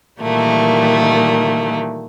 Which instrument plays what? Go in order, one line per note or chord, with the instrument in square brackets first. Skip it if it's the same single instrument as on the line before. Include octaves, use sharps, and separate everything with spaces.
[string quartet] A#2 D#3 E3 G3 A3 A#3